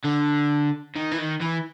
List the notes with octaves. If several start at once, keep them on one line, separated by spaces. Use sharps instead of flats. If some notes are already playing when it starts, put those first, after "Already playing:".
D3
D#3
E3
D#3
E3